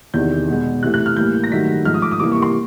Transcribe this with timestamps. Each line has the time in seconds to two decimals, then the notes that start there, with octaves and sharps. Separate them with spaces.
0.14 E2 C3 D#3 G6
0.48 B2 G#3
0.83 C3 E3 A3 F#6
0.94 F#6
1.06 F6
1.17 A2 E3 G3 A#3 G6
1.44 A#6
1.51 G2 D#3 F#3 A3 B6
1.85 G#2 F3 A3 F6
1.94 D#6
2.02 D6
2.11 D#6
2.20 C3 E3 G3 A#3 D6
2.32 C#6
2.42 C6